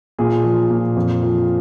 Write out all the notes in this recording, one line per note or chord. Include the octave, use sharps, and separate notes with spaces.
A#2 G#4
F3
A#2
F2
F3